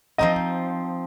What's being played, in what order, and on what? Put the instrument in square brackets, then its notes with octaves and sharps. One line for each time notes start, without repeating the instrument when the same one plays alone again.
[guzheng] F3 C4 D#4 [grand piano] D#5